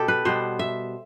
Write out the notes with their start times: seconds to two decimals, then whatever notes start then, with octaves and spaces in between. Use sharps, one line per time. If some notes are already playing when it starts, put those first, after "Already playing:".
Already playing: B2 B3 G4 A4
0.08 B4
0.25 B2 G3 B3 C5
0.59 E5